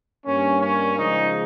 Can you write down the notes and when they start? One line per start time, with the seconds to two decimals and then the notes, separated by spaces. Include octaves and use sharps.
0.24 G2 G3 A#3 C#4
0.61 C#4
0.97 C#3 F3 G#3 D#4